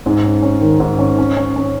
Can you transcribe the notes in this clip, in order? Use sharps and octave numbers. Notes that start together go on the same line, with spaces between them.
G#2
C#4
C#4
D#3
G#2
C#4
C#4
C#4
C#4